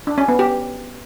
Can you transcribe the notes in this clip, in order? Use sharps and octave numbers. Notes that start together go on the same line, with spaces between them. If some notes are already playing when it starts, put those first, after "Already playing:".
D4
C#4
B3
G4